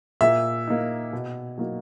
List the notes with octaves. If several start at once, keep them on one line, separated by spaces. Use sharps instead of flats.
A#2 E5
A#3 D#4
B2
F#3 A#3 D#4